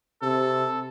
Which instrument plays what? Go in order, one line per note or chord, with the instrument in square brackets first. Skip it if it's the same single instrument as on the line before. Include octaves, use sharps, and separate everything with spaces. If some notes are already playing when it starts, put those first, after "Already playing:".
[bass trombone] C3 [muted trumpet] A4